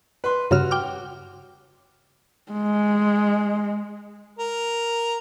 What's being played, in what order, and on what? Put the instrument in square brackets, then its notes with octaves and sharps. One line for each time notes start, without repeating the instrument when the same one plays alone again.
[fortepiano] B4 C6
[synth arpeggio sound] G2 C#3 F6 [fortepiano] F#4
[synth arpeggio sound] G5 D6 F6
[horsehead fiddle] G#3
[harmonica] A#4